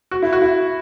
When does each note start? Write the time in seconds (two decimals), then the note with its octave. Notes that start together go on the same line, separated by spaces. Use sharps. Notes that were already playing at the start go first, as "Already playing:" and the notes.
0.11 F#4
0.22 E4
0.33 F#4
0.42 E4